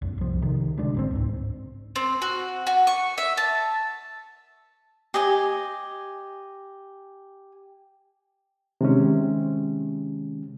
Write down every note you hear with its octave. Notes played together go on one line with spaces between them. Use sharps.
B1 F#2
C2 F3
C3 D#3
D2 G#3 D4
G#1 C#3 C4
C#2 G#2
C4
F#4
F#4
C#6
E5
A5
G4 D#5 G#5
C3 D#3 G#3 C#4